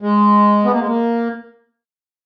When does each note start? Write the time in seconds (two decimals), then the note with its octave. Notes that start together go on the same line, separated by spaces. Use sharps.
0.02 G#3
0.65 B3
0.72 A#3
0.80 G#3
0.87 A#3